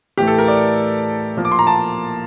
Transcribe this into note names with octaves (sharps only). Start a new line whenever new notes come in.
A2 E3 A3 G4
A4
A#4
D5
A#2 F3 A#3
D6
C6
A#5
A5